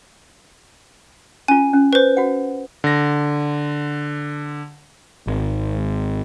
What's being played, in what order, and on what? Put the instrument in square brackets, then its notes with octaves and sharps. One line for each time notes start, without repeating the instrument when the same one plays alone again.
[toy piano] C#4 F4 [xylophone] G#5
[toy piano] C#4
[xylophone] B4 C5
[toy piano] F#4 F#5
[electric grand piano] D3 A#6
[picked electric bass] G#1